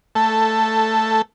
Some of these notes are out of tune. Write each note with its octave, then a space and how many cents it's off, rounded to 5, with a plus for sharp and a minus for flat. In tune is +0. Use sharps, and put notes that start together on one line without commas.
A3 +10 A4 +0